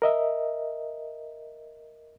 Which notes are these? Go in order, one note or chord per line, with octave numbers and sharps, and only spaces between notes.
A#4 D#5 E5